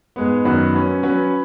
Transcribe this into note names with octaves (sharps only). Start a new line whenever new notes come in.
G#2 G#3 B3
F#2 D#3 B3 F#4 B4
F#3 C#4 B4
F#3 C#4 F#4 B4